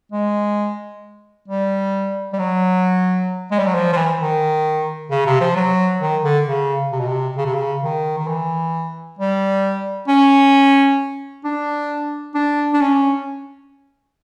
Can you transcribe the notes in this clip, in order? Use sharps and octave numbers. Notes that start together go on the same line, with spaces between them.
G#3
G3
G3
F#3
G#3
G3
F#3
F3
F3
E3
D#3
C#3
C3
F3
F#3
D#3
D3
C#3
C3
B2
C3
C#3
C3
C#3
D#3
D#3
E3
G3
C#4
D4
D4
D4
C#4